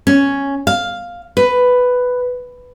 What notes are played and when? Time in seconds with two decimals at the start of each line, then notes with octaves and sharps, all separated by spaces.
0.07 C#4
0.67 F5
1.37 B4